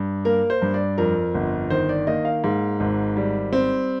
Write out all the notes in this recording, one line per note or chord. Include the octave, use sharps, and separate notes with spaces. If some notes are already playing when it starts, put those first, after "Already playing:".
Already playing: G2
A#3 A#4
C5
G2
D5
F2 A#4
G1
D#3 C5
D5
A#3 D#5
F5
G#2
G#1
G3
C4